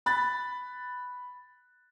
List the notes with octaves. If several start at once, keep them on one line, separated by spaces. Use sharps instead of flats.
B5 F#6 A6